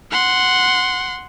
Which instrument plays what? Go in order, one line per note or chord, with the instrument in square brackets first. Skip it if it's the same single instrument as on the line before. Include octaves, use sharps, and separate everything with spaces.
[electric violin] F#5 C6